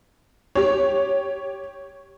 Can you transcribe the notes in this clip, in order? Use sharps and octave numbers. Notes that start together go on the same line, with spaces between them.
G4 C#5